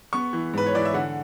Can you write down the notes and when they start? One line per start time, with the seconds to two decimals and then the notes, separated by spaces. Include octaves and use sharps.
0.13 B3 C#6
0.33 E3
0.53 G#2 B4
0.66 C#5
0.74 E3 D5
0.85 E5
0.94 D3 F#5